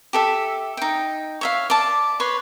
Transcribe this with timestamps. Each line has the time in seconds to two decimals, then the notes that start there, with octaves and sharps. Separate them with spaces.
0.13 G4 A4 E5
0.77 D#4 G5
1.41 C#5 E5 F5
1.70 D5 A5
2.20 B4 C#5 C6